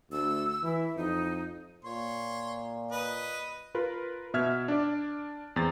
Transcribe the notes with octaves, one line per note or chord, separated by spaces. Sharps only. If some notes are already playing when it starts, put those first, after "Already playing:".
D2 E6
E3 E4
F2 D#4
A#2 C#5 C6
B4 D#5
F4 A#4 B4
B2 E5 F6 G#6
D4 D5
E2 C4 C5 A6